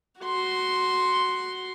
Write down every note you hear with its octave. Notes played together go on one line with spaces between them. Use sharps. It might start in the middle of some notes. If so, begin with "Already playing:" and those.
F#4 C6